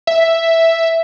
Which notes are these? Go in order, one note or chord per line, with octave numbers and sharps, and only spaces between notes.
E5